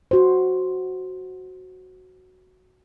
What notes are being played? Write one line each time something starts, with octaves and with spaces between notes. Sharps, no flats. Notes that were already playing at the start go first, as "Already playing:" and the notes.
F#4 C5